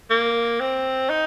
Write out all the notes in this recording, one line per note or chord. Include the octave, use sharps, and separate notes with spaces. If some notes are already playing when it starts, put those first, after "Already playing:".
A#3
C4
D#4